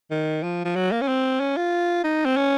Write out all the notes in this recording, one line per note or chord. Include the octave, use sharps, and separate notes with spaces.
D#3
F3
F3
F#3
A#3
C#4
C4
C#4
F4
D#4
C4
C#4